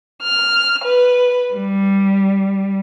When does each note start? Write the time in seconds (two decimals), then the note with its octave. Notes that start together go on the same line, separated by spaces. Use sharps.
0.24 F6
0.84 B4
1.54 G3